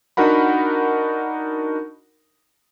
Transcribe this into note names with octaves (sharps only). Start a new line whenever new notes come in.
D4 D#4 F#4 A#4 F#5 B5